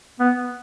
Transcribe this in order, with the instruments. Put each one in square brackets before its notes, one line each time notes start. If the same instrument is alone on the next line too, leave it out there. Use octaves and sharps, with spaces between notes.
[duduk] B3